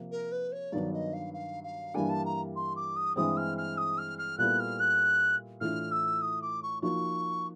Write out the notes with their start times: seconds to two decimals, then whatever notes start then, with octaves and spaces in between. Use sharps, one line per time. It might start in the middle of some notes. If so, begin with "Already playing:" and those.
Already playing: C3 F3 A#3
0.11 A#4
0.32 B4
0.52 C#5
0.72 G2 D#3 F#3 B3 D4 D5
0.93 D#5
1.13 F5
1.33 F5
1.63 F5
1.94 G2 E3 G3 A#3 D4 G#5
2.09 A5
2.25 A#5
2.56 C6
2.76 D6
2.96 D#6
3.16 G2 E3 G#3 C4 D#6
3.37 F6
3.58 F6
3.77 D#6
3.98 F6
4.18 F6
4.38 A#2 G3 B3 E4 A4 F#6
4.59 F6
4.80 F#6
5.61 A2 E3 A3 D4 F4 F6
5.91 E6
6.21 D#6
6.42 D6
6.62 C#6
6.82 F3 A#3 D#4 F#4 C#6